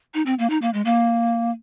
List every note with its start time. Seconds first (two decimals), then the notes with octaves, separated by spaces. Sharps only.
0.14 D#4
0.26 C4
0.39 A#3
0.50 D#4
0.62 A#3
0.74 G#3
0.85 A#3